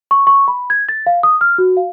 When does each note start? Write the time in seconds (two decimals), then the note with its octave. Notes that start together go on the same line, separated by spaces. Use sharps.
0.11 C#6
0.27 C#6
0.48 B5
0.70 G#6
0.89 A6
1.07 F5
1.23 D#6
1.41 F6
1.58 F#4
1.77 F5